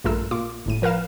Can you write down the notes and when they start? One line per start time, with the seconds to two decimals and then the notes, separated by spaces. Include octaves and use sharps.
0.04 A#1 G2 A3 F4 A#4 E6
0.31 A#2 F4 D6
0.66 G1 A2 D#7
0.82 F3 A#4 B4 F5 E7